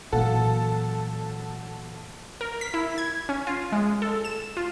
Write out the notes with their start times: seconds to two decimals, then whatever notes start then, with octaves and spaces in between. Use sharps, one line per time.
0.12 A#2 E3 F#3 A4 F5 F#5
2.41 A#4
2.61 B6
2.74 E4
2.98 G#6
3.29 C#4
3.47 F4
3.72 G#3
4.02 A4
4.25 E7
4.57 F4